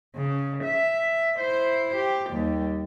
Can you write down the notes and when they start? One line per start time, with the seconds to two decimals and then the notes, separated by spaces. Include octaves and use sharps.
0.15 C#3
0.63 E5
1.39 E4 C5
1.96 G4
2.30 D#2 G3